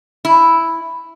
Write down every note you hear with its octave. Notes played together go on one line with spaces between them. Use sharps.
E4